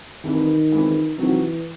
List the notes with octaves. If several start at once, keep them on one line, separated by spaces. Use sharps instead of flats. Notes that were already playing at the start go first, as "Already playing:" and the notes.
C2 C3 D#3 E3
C#2 C#3 E3 G#3 C4
C3 D#3 E3 F#3 C4 F#4